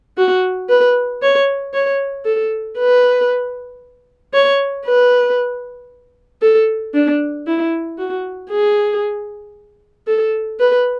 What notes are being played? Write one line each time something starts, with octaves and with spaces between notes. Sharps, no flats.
F#4
B4
C#5
C#5
A4
B4
C#5
B4
A4
D4
E4
F#4
G#4
A4
B4